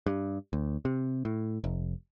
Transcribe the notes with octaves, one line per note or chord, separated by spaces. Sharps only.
G2
D2
C3
A2
F1